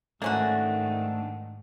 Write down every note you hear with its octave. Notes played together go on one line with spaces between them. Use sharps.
G#2 D#3 A3 A#3 C#4 D4 F#4